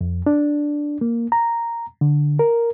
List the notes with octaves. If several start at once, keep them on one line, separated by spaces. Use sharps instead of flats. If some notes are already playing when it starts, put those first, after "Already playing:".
F2
D4
A#3
A#5
D3
A#4